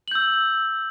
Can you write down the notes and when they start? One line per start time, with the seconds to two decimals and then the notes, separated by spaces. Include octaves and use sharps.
0.08 F#7
0.11 G6
0.15 E6